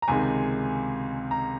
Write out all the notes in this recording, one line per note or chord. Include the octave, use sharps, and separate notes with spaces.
A#5
C#2 C3 D#3 G#3 G#5
A#5